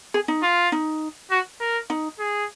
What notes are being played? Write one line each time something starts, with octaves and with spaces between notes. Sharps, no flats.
G#4
D#4
F4
D#4
F#4
A#4
D#4
G#4